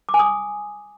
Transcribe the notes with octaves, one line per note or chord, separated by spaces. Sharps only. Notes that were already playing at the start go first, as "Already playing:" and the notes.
D6
G#5
D#6